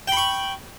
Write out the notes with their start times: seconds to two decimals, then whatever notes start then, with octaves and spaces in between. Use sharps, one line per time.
0.08 G5
0.12 B5
0.17 C#6